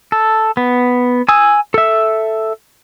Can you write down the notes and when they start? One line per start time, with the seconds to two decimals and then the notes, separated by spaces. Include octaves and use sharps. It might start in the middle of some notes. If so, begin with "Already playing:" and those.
0.12 A4
0.57 B3
1.28 G#5 D#6 E6
1.74 A4 E5